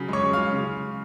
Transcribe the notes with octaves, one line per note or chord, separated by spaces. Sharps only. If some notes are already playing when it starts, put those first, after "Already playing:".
Already playing: C#3 F#3
G#3 C#5 C#6
C#3
F5 F6
G#3
C#3